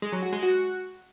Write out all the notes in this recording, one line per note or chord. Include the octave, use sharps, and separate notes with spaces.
G#3
F#3
F#4
G#3
F#4